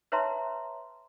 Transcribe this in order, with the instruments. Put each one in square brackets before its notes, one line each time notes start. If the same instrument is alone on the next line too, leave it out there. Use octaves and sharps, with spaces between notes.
[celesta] B4 C#5 E5 A5 A#5 C6